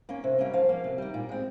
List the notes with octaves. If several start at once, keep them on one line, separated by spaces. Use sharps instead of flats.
A#3 C#4
C3
G3 A#3 C#4
F3 F5
A#3 C#4
C3
D#3 G3
A#2
G#3 C4